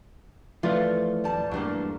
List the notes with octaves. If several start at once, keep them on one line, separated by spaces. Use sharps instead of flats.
E3 F3 A3 F4 B4 D5 F5
D1 G3 A5
E2 G2 F#3 A3 A#3